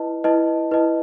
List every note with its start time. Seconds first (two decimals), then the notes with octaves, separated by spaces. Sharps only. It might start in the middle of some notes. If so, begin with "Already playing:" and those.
Already playing: E4 B4 D#5 A5
0.24 E4 B4 D#5 A5
0.71 E4 B4 D#5 A5